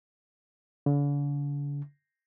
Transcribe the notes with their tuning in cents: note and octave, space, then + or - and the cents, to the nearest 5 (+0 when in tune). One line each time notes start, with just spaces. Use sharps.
D3 -45